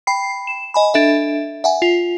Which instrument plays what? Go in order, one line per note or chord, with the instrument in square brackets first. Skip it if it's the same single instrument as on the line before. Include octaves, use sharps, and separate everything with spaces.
[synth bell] G5 B5 C7
E7
D#5 G#5 B5
D4 A4 E5
E5 F#5 G#5
F4